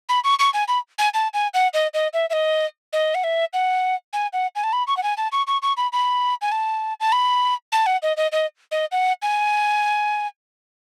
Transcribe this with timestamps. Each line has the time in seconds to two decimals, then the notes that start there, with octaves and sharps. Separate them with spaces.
0.09 B5
0.24 C#6
0.39 C#6
0.54 G#5
0.68 B5
0.99 G#5
1.14 A5
1.34 G#5
1.54 F#5
1.74 D#5
1.94 D#5
2.13 E5
2.30 E5
2.33 D#5
2.93 D#5
3.15 F#5
3.24 E5
3.53 F#5
4.13 G#5
4.33 F#5
4.56 G#5
4.64 A5
4.73 B5
4.87 C#6
4.97 F#5
5.03 G#5
5.17 A5
5.32 C#6
5.47 C#6
5.62 C#6
5.77 B5
5.93 B5
6.42 G#5
6.52 A5
7.00 A5
7.12 B5
7.72 A5
7.86 F#5
8.03 D#5
8.17 D#5
8.32 D#5
8.71 D#5
8.92 F#5
9.22 G#5